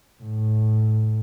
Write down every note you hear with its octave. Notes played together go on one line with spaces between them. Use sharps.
A2